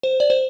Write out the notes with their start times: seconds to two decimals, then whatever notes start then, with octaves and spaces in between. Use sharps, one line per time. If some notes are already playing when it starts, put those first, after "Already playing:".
0.03 C5
0.20 D5
0.30 C5